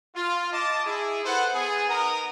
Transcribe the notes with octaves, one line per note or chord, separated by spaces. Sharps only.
F4
D#5 A5 D6
E4 G#4
A4 B4 C5 F#5
B3 G#4
B3 D#4 A#4 F#5 A#5 D#6